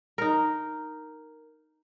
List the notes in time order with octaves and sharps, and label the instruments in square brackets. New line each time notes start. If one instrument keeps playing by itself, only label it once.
[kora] D#4 A#4